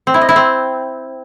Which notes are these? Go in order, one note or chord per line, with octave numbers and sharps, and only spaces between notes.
C4
E4
D#5
E4
C4